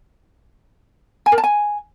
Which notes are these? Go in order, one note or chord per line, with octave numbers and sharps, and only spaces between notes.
G#5
A#4
A5
G#5